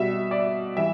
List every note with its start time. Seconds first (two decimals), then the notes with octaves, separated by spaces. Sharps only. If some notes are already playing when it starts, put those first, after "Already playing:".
Already playing: B2 G3 E5
0.31 D5
0.77 E3 G3 E5